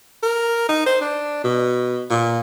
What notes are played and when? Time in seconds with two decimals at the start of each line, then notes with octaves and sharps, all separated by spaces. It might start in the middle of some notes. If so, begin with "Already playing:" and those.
0.23 A#4
0.69 D#4
0.86 C5
1.01 D4
1.44 B2
2.11 A#2